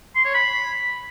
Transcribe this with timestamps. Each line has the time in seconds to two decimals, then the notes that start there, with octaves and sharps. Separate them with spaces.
0.15 C6
0.25 C#5
0.34 B5